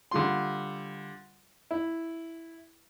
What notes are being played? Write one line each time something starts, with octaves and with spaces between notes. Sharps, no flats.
D3 G3 F4 C6
E4